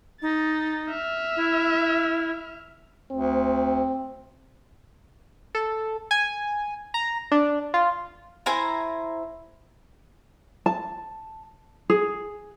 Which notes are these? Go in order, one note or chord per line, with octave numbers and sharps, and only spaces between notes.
D#4 A6
E5 F6
E4
D2 C4
A4
G#5
A#5
D4
F4
E4 C5 G#5 A#5
A5
G#4